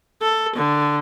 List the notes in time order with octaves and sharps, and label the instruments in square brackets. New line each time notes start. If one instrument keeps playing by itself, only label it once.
[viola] A4
D3